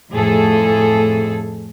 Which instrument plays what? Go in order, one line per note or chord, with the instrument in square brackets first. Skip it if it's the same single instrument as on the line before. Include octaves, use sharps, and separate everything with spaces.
[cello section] F2 A2 G#4 A4